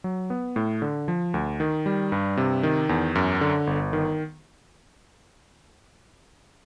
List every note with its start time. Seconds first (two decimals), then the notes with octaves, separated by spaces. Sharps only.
0.04 F#3
0.30 B3
0.56 A2
0.82 D3
1.08 F3
1.34 D2
1.60 D#3
1.86 G3
2.12 G2
2.37 C3
2.63 D#3
2.89 E2
3.15 F#2
3.41 D3
3.67 G1
3.93 D#3